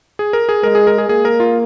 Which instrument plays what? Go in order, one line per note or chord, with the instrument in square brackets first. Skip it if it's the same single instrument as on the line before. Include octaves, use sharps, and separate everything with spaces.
[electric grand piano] G#4
A#4
G#4
[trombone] G#3 [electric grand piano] A#4
[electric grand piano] G#4
A#4
G#4
[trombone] A#3 [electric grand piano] G#4
[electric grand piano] A#4
F4